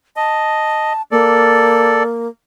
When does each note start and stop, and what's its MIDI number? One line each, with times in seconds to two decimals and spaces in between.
0.16 0.93 75
0.16 1.02 81
1.11 2.28 58
1.11 2.03 69
1.11 2.03 74